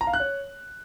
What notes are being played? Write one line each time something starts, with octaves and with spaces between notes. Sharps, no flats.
A#5
F5
F#6
C#5